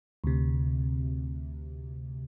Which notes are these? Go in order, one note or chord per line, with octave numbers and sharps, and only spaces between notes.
D2 C3